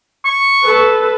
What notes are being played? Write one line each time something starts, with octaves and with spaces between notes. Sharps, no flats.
C#6
A4 B4